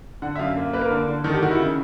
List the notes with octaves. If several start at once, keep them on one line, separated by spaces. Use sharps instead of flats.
D3 F#5
E5
F#2 F5
A#3
A#3 B4
A#4
D3
D3
D#3 A4
G4
D#3 F#4
E4
C#3